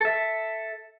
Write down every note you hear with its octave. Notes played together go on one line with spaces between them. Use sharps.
A4 E5